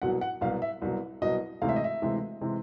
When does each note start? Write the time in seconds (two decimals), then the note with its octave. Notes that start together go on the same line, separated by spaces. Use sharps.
0.02 C2 B2 F#3 F#5
0.21 F#5
0.41 C2 B2 F#3 F5
0.62 E5
0.82 C2 B2 F#3
1.22 C2 B2 F#3 D#5
1.62 D2 C3 E3 G#3 F5
1.69 E5
1.76 D#5
1.84 E5
2.02 D2 C3 E3 G#3
2.41 C3 E3 G#3